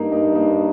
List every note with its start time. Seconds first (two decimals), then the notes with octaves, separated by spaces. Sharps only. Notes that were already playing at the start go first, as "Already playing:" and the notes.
Already playing: G2 A#3 D#4
0.12 A#3 D#4
0.35 A#3 D#4